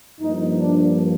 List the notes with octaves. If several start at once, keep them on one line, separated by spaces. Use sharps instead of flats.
G2 F3 A#3 D#4
D4